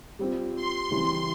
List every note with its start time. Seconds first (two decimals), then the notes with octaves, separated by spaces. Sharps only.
0.19 G3 C4 F4
0.56 C6
0.90 C#3 E3 G3 C4 E4 C6